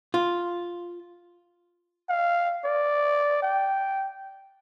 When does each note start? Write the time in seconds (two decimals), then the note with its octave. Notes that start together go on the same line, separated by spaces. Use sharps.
0.14 F4
2.09 F5
2.65 D5
3.42 G5